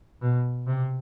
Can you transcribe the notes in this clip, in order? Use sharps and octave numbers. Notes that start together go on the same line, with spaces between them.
B2
C3